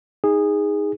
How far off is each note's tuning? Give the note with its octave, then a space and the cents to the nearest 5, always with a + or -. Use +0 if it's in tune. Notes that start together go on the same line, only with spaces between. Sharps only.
D#4 +10 G#4 -15